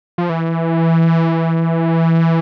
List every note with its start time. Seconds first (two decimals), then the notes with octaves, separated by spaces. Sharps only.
0.18 F3
0.30 E3